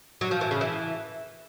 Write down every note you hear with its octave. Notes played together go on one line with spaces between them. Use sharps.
F#3
F3
E3
C#3
E3